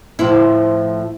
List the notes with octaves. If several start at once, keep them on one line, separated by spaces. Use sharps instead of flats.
A2 F3 E4